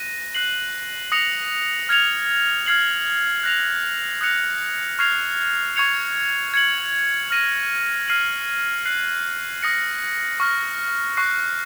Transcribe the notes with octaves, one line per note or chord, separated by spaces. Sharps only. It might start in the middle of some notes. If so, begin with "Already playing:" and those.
Already playing: F#6 A#6 D#7
F#6 C7 F#7
D#6 A#6 C#7 F7
F6 G#6 C#7 F7
F6 G#6 C7 F#7
F#6 A#6 F7
D#6 F#6 A#6 C#7 F7
C#6 F6 G#6 C7 F7
C#6 G#6 C#7 F7
G#6 C#7 F#7
F6 A#6 D#7 F#7
F6 C7 D#7 F#7
F#6 C7 F#7
D#6 A#6 C#7
C#6 F6 A#6
C#6 F#6 C7